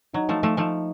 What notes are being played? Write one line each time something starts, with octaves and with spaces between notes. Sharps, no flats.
F#3 D#4
F3 A3
F3 A3
F3 A3 D#4